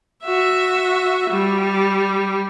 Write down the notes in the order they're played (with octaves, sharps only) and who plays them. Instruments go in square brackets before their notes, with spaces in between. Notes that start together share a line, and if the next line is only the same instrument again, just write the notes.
[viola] F#4 E5
G3